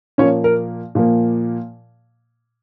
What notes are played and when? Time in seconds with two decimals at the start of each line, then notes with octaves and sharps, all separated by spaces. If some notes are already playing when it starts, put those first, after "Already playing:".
0.18 A#2 F3 A#3 C#4 C#5
0.44 A#4
0.95 A#2 F3 A#3